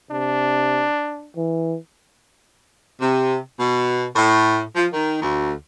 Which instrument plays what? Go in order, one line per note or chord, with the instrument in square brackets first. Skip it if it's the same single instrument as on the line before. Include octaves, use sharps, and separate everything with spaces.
[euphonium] C3 [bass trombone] D4
[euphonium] E3
[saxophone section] C3
B2
A2
F3
D#3
D2